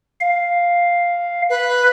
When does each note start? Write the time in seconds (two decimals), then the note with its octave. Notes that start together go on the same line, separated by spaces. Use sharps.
0.21 F5
1.50 B4